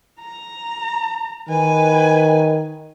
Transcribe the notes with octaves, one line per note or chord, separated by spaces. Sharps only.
A#5
D#3 B4 G#5